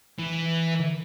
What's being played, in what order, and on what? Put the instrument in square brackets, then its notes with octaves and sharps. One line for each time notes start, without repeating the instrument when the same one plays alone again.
[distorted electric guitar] E3